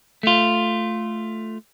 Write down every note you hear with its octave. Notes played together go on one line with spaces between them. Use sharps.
A3 F4